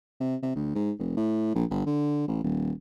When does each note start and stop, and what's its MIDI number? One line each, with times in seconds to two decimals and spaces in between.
0.20 0.36 48
0.43 0.53 48
0.55 0.75 38
0.75 0.92 44
0.99 1.14 29
1.17 1.53 45
1.55 1.65 34
1.70 1.86 31
1.86 2.27 50
2.28 2.43 33
2.43 2.72 27